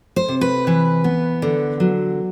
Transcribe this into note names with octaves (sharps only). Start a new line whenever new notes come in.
C5
C3
B4
E3
B3
D3
F#3